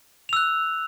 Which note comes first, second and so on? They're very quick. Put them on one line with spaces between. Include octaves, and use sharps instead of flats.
F7 E6 F#6